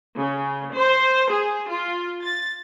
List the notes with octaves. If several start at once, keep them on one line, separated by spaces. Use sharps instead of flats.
C#3
C5
G#4
F4
A6